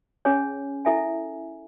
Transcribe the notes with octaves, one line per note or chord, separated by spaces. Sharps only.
C#4 G#4 C#5 G#5
E4 A4 E5 G#5